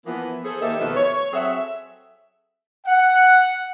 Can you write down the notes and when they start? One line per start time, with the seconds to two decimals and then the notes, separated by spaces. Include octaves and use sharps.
0.06 E3 F3 A#3 B3
0.45 G#4 A4 C5
0.61 D#2 A#3 D#4 G4 A4 E5
0.80 B2 D#3 F3 A3 B3
0.96 C#5
1.33 F#3 C4 G#4 A4 E5
2.86 F#5